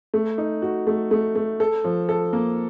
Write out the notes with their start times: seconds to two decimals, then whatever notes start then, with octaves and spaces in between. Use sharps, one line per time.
0.14 A3
0.38 D#4
0.62 F#4
0.87 A3
1.11 A3
1.35 A3
1.60 A4
1.84 F3
2.09 A4
2.33 A#3